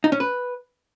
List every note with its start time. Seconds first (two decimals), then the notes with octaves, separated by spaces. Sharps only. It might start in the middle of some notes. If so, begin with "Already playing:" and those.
0.04 D#4
0.12 C#4
0.20 B4